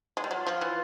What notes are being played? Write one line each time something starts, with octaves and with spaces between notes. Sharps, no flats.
G#3
G3
F#3 F4
F3
E3